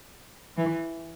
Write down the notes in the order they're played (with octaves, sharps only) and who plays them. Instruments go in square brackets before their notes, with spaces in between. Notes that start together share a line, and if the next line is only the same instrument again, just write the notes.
[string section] E3